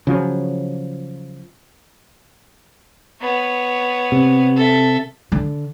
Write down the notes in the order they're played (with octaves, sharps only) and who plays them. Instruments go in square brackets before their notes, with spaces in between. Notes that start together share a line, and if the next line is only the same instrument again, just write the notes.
[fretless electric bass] C#3 F3 F#3
[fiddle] B3 C#5
[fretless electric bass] C3
[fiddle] A4 E5
[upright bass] D3